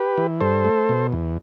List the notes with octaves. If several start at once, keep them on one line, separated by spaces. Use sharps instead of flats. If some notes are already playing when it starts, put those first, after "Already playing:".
Already playing: G4 B4
E3
G2 A4 C5
A3
B2
E2